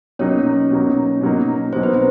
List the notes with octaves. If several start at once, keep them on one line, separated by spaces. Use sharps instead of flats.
B2 F#3 A#3 C#4 D#4 C#5
B2 F#3 A#3 D#4
B2 F#3 A#3 D#4
B2 F#3 A#3 D#4 C5
B4
C4 C5